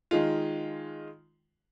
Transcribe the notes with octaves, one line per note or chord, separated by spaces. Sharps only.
D#3 G#3 F4